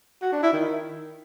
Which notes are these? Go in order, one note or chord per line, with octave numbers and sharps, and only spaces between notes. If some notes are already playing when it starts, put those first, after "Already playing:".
F#4
D4
E4
D#3